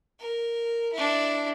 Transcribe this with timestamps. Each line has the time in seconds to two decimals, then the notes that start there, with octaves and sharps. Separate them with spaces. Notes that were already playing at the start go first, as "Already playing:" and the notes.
0.20 A#4
0.93 D4 E4